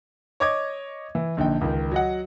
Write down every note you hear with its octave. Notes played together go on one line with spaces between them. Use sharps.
C#5 D#5 D6 G#6
E3
A#1 D3 D#4 G5
C#2 D#3
F#3 D#5 F#5